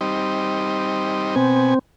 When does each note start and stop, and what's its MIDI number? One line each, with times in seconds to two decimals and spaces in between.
0.01 1.35 55
0.01 1.35 60
0.01 1.35 63
1.36 1.74 47
1.36 1.79 60
1.36 1.74 80